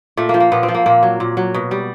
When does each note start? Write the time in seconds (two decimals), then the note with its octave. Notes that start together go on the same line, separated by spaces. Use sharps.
0.17 A#2 A3
0.29 F3 A#3
0.40 A#3
0.52 A#2 B3
0.63 C4
0.68 F3
0.74 A#3
0.86 A#2 A#3
1.03 F#3
1.20 A#2
1.37 F#3
1.54 B2
1.71 G3